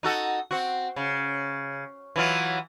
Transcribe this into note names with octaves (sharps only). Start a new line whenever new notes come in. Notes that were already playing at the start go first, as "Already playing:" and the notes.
D#4 F#4 A4
C4 F#4
C#3
E3 F#3 F4